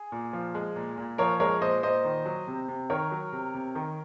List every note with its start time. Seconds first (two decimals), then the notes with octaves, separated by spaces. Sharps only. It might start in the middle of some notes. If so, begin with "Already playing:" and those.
Already playing: G#4
0.12 A#2
0.33 F3
0.55 G#3
0.76 A#2
0.98 A#2
1.18 F3 A#4 C#5
1.40 G#3 A#4 C#5
1.61 A#2 C5 D#5
1.83 A#2 C5 D#5
2.05 D#3
2.26 F#3
2.48 C3
2.68 C3
2.90 D#3 A#4 C#5
3.12 F#3
3.33 C3
3.54 C3
3.75 D#3